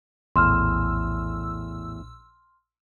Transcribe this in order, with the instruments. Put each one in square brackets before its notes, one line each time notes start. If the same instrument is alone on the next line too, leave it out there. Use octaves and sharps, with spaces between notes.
[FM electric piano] A#1 E6 [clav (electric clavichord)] E2 A2 [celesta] C6 F6